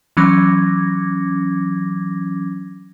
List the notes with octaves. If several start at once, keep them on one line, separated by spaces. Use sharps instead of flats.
E3 F#3 C#4 D6 G#6 A#6